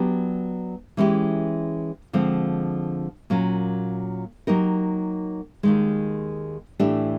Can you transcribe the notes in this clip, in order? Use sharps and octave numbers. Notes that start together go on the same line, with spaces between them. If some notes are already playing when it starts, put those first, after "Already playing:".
Already playing: F#3 B3 D4 G4
E3 G#3 C#4 E4 G4
D3 F3 G#3 C4
A#2 F#3 A#3 C#4
F#3 A#3 D#4 G4 A#4
D#2 D#3 G#3
A2 E3 A3 D4 G4